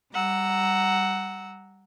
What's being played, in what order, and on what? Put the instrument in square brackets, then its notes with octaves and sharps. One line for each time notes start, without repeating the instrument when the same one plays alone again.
[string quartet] G3 F#5 A#5 E6